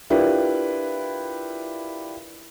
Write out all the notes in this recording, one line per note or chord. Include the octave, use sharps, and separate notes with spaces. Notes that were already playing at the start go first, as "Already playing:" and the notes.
D4 E4 F4 G4 A#4 B4